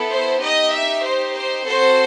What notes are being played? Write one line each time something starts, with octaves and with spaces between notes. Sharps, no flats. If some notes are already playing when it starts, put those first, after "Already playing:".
Already playing: B3 E4 A4
C5
D#4 G4 D#5
E5
C5
C5
C4 F#4 A4 C5